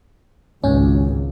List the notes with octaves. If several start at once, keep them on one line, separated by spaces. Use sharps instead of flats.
G#1 C#2 G#2 C#4